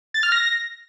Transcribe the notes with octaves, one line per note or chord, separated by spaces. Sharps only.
A6
F6
A#6